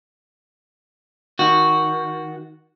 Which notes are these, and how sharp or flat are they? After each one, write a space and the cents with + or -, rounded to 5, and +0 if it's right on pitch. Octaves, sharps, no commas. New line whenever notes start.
D#3 +20 F#4 +0